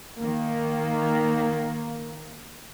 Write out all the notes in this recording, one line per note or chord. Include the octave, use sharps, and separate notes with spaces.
D#3 A#3